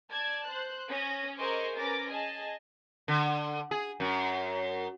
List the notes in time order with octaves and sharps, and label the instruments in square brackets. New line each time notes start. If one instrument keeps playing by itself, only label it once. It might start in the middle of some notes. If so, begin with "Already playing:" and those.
[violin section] D5 A5 G#6
C5 F#6
C#4 D#6 A#6
G#4 A#4 C5 D#5 C#6 D6
C#4 A#4 B4 D6 A6 A#6
G#4 D#5 G#5 A5
[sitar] D3
G#4
F#2